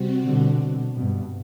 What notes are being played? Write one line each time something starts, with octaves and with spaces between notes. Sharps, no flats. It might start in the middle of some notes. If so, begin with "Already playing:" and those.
Already playing: C3 G3 C4 F#4
B2 D3
G2 B2